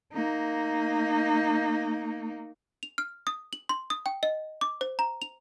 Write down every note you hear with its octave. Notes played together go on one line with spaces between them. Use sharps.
A#3 D#4
F7
F6
D#6
F#7
C6
D#6
G5
D#5
D6
C5
A#5
F7